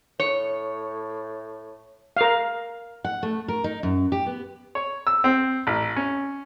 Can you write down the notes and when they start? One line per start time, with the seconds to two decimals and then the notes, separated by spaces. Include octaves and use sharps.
0.20 A2 C#5
2.17 A#4 F5
3.04 F#5
3.23 A3
3.48 A#4
3.64 D#4
3.83 F#2
4.12 G4
4.26 B3
4.75 C#5
5.07 E6
5.24 C4
5.67 A1
5.96 C#4